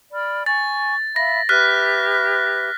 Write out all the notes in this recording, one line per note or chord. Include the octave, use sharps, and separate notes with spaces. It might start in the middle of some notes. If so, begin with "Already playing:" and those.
D5 B5 F6
G#5 C#6 A6
E5 F5 B5 A#6
G4 B4 E5 F6 F#6 B6